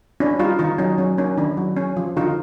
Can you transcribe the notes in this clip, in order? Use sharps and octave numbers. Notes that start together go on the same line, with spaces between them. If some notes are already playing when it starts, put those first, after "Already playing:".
C#4 D4 E4
G3 D#4 F4
D#3 D#4 F4
F#3 C#4 D#4
F#3 C#4
A#3 C#4 D#4
D#3 D4 E4
F#3
C#4
F3
D3 D#4 F4